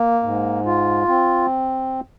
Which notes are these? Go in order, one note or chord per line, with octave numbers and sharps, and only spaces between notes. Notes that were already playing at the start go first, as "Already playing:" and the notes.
Already playing: A#3
G#2
F4
C4